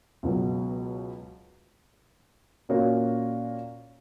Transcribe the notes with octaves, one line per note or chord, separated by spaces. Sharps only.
C#2 B2 F#3
A#2 A#3 C#4 F#4 C#5